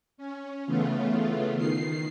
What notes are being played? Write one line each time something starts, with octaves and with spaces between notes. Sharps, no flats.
C#4
C#3 E3 A3 B3 F4
D#3 C7